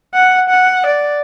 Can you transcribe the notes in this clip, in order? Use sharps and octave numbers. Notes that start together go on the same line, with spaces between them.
F#5
F#5
D5